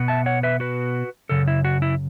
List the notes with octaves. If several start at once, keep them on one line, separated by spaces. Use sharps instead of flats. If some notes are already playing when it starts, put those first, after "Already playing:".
Already playing: B2 B3
E5 A5
C#5 F#5
B4 E5
F#4 B4
F#2 C#3 A4
E4
F#4
E4